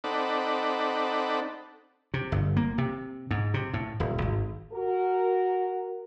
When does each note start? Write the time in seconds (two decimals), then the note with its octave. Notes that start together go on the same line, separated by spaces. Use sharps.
0.04 C4 D#4 A4 D5 F#5 B5
2.14 C3
2.32 G1
2.57 A#3
2.78 C3
3.31 G#2
3.54 C3
3.74 A2
4.00 D#1
4.22 G#1
4.73 F#4 A#4